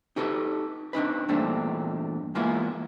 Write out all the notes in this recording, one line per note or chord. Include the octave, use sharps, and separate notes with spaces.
D#4 G4 A4 B4
C4 D4 D#4 B4
E2 G2 A#2 A3 C4 D4
E3 G#3 A#3 B3 E4 F4